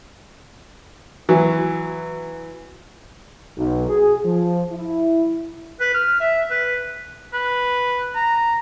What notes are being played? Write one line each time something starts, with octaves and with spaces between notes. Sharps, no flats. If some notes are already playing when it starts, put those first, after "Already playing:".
E3 F#3
B1
G#4
F3
E4
B4
F6
E5
B4
B4
A#5